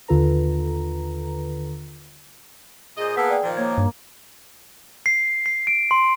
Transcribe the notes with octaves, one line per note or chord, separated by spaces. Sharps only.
D#2 D3 F4 A4 B4 A#5
A#2 G#4 C5 D#5
A#3 B3 A5 E6 B6
D5 G5
A#2 D#3 F3
A#3 C#5 G#6
G2
C7
C7
D7
C6